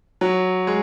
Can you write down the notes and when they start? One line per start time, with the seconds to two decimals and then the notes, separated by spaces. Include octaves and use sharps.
0.21 F#3
0.67 G#3